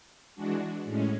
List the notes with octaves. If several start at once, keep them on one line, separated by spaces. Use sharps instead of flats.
E3 G#3 D4 F#4
A2 G#3 C#4